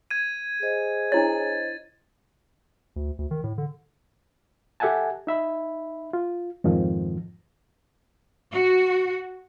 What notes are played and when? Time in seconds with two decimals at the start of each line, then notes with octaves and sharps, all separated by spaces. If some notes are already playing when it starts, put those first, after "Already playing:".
0.11 G#6 D#7
0.62 G#4 C5 D#5
1.12 D4 E4 C#5 A6
2.96 D2
3.19 D2
3.31 D#3
3.44 A2
3.58 D3
4.80 G4 A4 E5 F#5 G#5 A5
5.27 D#4 E5 B5
6.13 F4
6.64 F2 G#2 D#3 F3
8.52 F#4